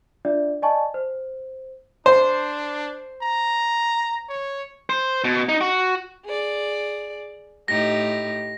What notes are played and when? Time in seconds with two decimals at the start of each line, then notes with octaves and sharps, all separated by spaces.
0.25 D4 F4 D5 E5
0.62 D5 D#5 G#5 A5 C#6
0.94 C5
2.06 D4 C5
3.23 A#5
4.29 C#5
4.90 C5
5.24 B2
5.49 D#4
5.61 F#4
6.25 G#4 D5
7.68 A2 D#4 G4 A#6